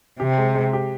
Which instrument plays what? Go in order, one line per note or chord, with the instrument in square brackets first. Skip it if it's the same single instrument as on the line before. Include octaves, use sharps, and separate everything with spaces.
[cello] C3 [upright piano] G4
[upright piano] G#3
G#3
G4